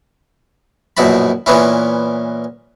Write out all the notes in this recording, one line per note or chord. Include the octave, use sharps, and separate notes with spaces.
A#1 F#2 B2 E4 A5 B5
A#2 E3 B3 C#4 E4